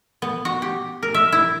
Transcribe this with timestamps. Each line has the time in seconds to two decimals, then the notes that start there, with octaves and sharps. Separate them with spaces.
0.22 B3
0.45 F#4
0.62 G4
1.03 A#4
1.14 E5
1.32 E4